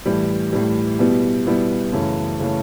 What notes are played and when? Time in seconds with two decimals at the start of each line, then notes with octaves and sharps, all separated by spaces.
0.06 A2 E3 G3
0.53 A2 E3 G3
0.99 B2 G3 B3 E4
1.47 B2 G3 B3 E4
1.92 F#2 C#3 E3 A3 C#4
2.40 C#3 E3 A3 C#4